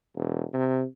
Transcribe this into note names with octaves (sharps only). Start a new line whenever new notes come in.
E1
C3